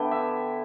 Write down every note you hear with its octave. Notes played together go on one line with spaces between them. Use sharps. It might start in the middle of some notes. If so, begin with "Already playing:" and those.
Already playing: D3 B3 E4 G5
E5